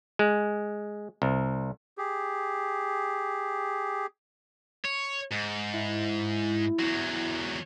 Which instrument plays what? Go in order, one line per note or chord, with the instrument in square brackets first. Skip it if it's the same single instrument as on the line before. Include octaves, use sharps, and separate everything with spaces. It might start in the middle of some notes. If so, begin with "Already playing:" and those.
[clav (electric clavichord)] G#3
C2
[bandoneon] G4 G#4
[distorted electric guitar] C#5
G#2
[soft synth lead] E4
[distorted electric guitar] E2 F#3